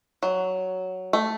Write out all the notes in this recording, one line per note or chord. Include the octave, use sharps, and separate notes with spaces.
F#3
A3